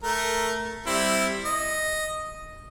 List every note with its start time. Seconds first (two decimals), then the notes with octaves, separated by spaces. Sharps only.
0.03 A3 A#4
0.86 G3 C4 E4
1.45 D#5